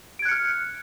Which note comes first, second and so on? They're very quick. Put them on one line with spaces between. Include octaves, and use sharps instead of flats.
D7 G#6 F#6 C#7 F6